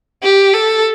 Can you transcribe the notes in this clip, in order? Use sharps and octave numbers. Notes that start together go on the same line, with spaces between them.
G4
A4